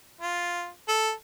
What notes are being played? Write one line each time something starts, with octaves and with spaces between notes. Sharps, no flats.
F4
A4